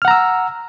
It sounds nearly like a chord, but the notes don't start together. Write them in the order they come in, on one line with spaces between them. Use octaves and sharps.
F6 F#5 A#5 E6